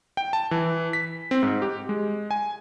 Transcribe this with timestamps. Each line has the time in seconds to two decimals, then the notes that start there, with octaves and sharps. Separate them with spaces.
0.17 G5
0.33 A5
0.51 E3
0.93 B6
1.31 C4
1.43 G#2
1.62 G4
1.89 G#3
2.31 G#5